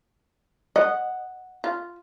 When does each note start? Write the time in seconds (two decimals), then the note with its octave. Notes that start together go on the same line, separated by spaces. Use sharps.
0.76 D#5 F#5
1.64 F4